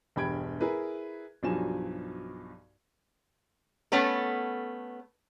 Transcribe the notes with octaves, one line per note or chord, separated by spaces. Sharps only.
E1 G2 G5 B5 G#6 D7
E4 G#4 A#4 B4
B1 G2 F3 F#3 G#5 E7
A3 B3 C#4 A4